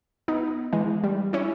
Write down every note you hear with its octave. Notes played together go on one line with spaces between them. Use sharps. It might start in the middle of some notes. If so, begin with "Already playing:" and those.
B3 D#4
E3 G#3
G3
C#4 E4